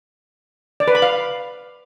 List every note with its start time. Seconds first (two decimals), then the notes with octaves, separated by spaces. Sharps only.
0.80 D5
0.88 B4
0.95 B5
1.02 F5